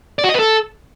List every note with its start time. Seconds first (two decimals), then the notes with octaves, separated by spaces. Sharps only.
0.19 D5
0.24 F#4
0.29 D#5
0.34 B4
0.39 A4